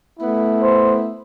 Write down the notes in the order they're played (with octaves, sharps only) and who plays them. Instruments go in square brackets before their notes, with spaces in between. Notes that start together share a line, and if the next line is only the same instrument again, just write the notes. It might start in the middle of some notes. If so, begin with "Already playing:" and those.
[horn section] A3 B3 E4
[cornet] C5